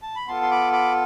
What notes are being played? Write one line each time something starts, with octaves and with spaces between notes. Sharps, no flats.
A5
B5
B3 F4 A4 A5 C6
C6
B5 D6
B5 D6